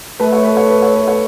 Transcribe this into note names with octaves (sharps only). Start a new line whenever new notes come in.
A3 B4
C#5
B4
C#5
B4
C#5
B4
C#5